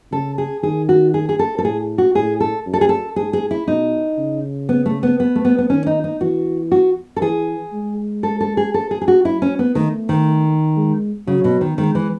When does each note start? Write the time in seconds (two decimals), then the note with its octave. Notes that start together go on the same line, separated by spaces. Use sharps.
0.12 C#3 A4
0.38 G#4
0.63 D#3 G#4
0.89 F#4
1.14 G#4
1.29 G#4
1.39 A4
1.58 A4
1.64 A2 G#4
1.98 F#4
2.15 A2 G#4
2.40 A4
2.66 F#2
2.73 A4
2.81 G#4
2.89 A4
3.16 G#2 G#4
3.33 G#4
3.51 E4
3.67 B2 D#4
4.18 C#3
4.69 B3
4.86 A3
5.03 B3
5.20 B3
5.35 A3
5.45 B3
5.58 B3
5.70 D#3 C#4
5.86 D#4
6.04 D#4
6.21 E3 F#4
6.71 F#4
7.16 A4
7.21 E3 G#4
7.73 G#3
8.23 A4
8.40 A4
8.57 G#4
8.74 A4
8.91 G#4
9.01 G#4
9.08 F#4
9.25 F#3 E4
9.42 C#4
9.59 B3
9.75 D#3 A3
10.09 D#3
10.77 G#3
11.27 C#3 F#3
11.44 B2
11.61 D#3
11.78 D#3 G#3
11.95 E3